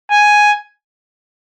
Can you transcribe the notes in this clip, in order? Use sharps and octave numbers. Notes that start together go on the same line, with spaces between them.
G#5